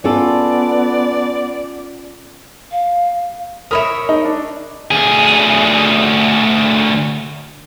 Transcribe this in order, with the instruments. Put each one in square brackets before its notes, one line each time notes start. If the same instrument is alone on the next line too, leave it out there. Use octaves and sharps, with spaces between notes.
[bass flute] B3 [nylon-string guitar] C#4 F4 A4 [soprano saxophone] D5
[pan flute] F5
[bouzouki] A#4 C#5 E5 [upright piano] B5 D#6
[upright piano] D#4
D4
[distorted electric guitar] D2 G#4